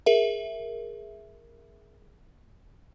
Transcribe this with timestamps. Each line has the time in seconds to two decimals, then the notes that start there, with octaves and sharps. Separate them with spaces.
0.06 G#4 A#4 E5